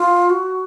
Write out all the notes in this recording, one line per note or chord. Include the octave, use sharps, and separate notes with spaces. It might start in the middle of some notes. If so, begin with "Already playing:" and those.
Already playing: F4
F#4